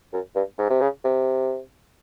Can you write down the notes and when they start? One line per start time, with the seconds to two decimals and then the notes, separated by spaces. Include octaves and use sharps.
0.13 F#2
0.35 G2
0.59 G#2
0.70 C3
0.81 C#3
1.04 C3